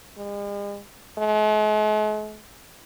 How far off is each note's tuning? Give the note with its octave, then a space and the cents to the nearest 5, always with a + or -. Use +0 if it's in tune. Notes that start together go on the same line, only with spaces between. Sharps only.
G#3 -45
G#3 +45